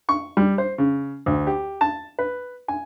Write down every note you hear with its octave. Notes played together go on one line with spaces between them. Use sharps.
C#6
G3
C5
C#3
D2
G4
A5
B4
G#5